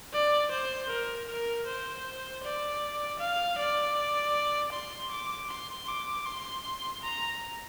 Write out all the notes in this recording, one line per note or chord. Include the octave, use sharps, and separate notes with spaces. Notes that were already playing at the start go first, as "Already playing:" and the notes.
D5
C5
A#4
A#4
C5
D5
F5
D5
C6
D6
C6
D6
C6
A#5